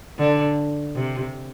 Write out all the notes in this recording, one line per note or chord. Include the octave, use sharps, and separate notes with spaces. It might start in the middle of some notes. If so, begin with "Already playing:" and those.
D3
C3